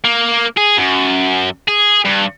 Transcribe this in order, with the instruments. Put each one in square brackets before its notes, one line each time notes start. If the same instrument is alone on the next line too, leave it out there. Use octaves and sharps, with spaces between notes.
[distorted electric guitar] A#3
G#4
F#2
G#4
G2